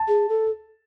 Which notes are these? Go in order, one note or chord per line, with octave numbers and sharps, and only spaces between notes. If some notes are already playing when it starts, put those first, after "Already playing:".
Already playing: A5
G#4
A4